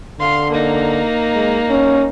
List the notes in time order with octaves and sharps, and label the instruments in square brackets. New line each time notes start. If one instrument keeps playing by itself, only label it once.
[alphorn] D3 [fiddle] F5 C6
[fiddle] A#3 D#4
[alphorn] G#3
C#4